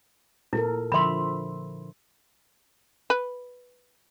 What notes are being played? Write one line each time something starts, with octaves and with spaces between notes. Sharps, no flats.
A#2 E4 A4 A#4
D3 F3 E5 B5 C6
B4